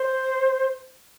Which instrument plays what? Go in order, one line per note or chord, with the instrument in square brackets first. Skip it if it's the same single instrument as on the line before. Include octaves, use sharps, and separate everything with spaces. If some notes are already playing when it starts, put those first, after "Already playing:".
Already playing: [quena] C5